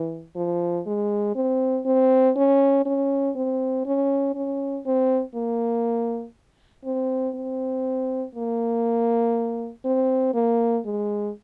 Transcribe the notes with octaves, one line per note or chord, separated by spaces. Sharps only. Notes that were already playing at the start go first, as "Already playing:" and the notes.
Already playing: E3
F3
G#3
C4
C4
C#4
C#4
C4
C#4
C#4
C4
A#3
C4
C4
A#3
C4
A#3
G#3